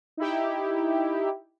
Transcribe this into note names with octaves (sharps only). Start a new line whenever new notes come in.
D#4 E4 G4